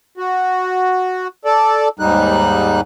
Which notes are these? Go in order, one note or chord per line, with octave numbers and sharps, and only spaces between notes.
F#4
A4 D5
D#2 G#2 G3 D#4 F#6